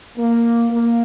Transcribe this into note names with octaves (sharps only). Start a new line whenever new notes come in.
A#3
A#3